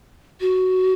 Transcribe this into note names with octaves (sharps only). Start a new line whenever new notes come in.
F#4